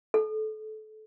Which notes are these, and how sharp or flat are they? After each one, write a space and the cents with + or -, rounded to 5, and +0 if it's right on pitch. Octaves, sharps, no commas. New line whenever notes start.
A4 -25